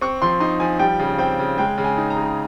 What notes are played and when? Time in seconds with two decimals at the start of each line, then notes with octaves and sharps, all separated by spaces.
0.01 C4 C#6
0.22 F3 C6
0.40 D#4 C6
0.60 F3 G#5
0.79 G3 G5
0.99 C#3
1.18 C4 G5
1.39 C#3
1.58 G#3 G5
1.78 C#3
1.84 G#5
1.98 D#4
2.10 A#5
2.17 C#3